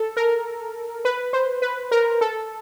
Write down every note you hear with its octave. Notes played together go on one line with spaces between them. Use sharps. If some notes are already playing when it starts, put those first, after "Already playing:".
Already playing: A4
A#4
B4
C5
B4
A#4
A4